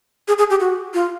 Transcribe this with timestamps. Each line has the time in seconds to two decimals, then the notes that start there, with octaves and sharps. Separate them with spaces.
0.28 G#4
0.38 G#4
0.50 G4
0.60 F#4
0.94 F4